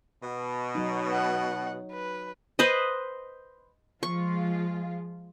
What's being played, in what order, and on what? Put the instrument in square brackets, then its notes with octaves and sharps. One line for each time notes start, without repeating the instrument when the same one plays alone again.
[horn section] B2
[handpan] F#3 D#4
[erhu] F#5
B4
[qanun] B4 C5 D#5
[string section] F3 G#3 F4 [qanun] C#6